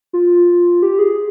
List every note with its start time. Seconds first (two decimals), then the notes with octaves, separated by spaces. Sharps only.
0.13 F4
0.82 G4
0.99 G#4